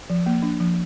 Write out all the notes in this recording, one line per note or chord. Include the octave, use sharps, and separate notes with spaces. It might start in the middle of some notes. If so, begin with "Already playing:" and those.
F3
A#3
D4
F3